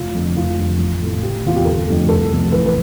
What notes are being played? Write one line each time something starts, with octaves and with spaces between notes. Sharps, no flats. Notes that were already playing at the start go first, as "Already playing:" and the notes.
Already playing: F1 F4
F2 D3
F1 F4
F2 D3 G3
A1
A2 E3 A3
F1 G4
E2 C3 F4
G4
G1 A4
F2 D3 A3
C2 A4
C3 F3 A3
A1 B4
B4